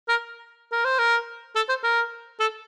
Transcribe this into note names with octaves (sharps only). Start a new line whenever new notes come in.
A#4
A#4
C5
A#4
A4
C5
A#4
A4